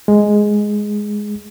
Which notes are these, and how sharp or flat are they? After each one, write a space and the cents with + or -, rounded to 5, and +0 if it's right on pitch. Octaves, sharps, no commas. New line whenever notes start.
G#3 +5